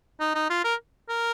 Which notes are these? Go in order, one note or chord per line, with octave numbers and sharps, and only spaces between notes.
D#4
D#4
F4
A#4
A#4